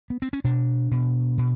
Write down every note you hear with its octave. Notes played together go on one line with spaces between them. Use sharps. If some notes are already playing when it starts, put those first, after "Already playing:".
B3
C4
C#4
B2 D4
B2
B2